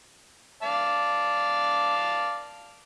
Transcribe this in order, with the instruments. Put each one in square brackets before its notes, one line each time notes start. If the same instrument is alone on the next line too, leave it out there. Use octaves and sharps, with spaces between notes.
[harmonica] D5 F5 A5